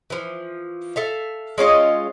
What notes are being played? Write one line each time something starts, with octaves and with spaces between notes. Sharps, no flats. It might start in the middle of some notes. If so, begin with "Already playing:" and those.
E3 F3
A4 E5 F5
G#3 C#4 F4 D#5